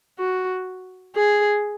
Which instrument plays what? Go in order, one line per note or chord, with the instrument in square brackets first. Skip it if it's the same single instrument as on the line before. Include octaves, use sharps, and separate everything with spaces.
[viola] F#4
G#4